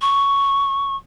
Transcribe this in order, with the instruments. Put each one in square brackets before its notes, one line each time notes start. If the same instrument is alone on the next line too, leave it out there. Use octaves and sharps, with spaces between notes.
[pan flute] C#6